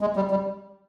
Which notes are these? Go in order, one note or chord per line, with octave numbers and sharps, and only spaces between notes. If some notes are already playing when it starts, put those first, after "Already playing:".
G#3
G3
G3